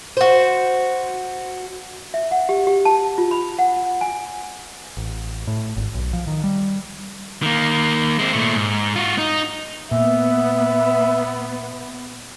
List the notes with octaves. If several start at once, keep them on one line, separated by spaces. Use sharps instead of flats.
F#4 C5
E5
F#5
G4
G4
A5
F4
B5
F#5
G#5
A1
A2
G#1
B1
F3
D#3
G3
D#3 A#3
G#3 C4
A#2 A3
G#2
F4 F#4
D#4
A#2 B3 E5